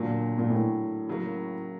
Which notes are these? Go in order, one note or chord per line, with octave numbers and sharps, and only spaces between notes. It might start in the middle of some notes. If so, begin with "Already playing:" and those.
Already playing: A#2 D3 F#3 A#3
A#2
A2
C#3 F#3 A#3